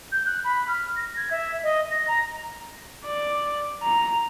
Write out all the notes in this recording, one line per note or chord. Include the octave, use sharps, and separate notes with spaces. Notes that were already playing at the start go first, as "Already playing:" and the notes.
G6
F#6
B5
F6
A#6
G#6
E5
D#5
A#6
A#5
D5
A#5